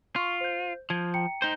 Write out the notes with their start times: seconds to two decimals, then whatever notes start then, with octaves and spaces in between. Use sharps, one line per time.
0.16 F4 C6 C#6
0.41 C5 G6
0.90 F3 G#6
1.14 G5 A#5 C#7
1.42 D#4 C5